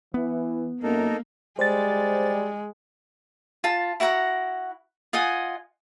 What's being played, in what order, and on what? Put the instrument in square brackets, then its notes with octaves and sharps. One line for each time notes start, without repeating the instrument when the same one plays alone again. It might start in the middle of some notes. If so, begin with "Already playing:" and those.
[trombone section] E3 [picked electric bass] B3
[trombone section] F#2 [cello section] A#3 [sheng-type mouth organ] D#4 A4 A#4
[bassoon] G3 [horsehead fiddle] G#3 [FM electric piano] C5 A6
[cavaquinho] F4 A5
E4 F#4 F#5 A#5
F4 D#5 F#5 G#5